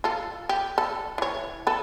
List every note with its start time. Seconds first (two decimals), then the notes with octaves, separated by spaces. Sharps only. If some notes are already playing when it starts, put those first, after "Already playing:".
0.04 F4 A4
0.49 G4
0.78 A4
1.18 E3 C#5
1.67 A4 B4